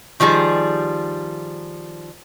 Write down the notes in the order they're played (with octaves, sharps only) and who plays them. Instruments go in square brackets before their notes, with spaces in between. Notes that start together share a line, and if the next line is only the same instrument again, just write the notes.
[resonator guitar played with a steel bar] D#3 F3 G3 G#4